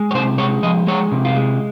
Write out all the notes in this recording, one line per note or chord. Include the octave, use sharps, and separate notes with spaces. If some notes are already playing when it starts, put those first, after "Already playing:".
Already playing: G#3
C#5
C3 C5
G#3 C#5
F3 D#5
G#3 C#5
C3
F4
G#3